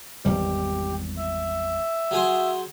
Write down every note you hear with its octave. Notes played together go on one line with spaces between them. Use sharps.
G#1 E2 G3 G4
E5
F#3 G#4 C5